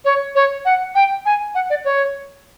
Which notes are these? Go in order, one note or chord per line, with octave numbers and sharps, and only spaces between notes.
C#5
C#5
F#5
G5
G#5
F#5
D5
C#5